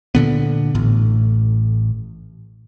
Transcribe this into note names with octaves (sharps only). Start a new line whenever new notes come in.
A#2 D3 B3
A1 A2